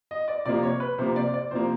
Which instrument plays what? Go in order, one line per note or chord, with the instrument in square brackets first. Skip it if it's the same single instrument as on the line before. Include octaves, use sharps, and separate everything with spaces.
[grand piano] D#5
D5
C3 F3 A#3 D5
C#5
B4
C3 F3 A#3 C5
D5
D5
C3 F3 A#3 C5